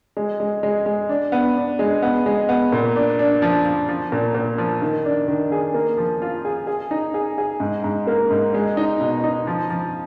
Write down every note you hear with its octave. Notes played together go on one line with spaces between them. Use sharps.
G#3
G#3
G#3
G#3
D4
B3
D4
G#3
B3
G#3
B3
A#2
D4
D4
F3
F3
F3
A#2
A#2
F3
D#3
D4
D#3
G#4
A#3
F3
F4
G#4
G#4
D#4
G#4
G#4
G#2
G#2
A#3
G#2
G#3
D#4
B2
D#4
F3
F3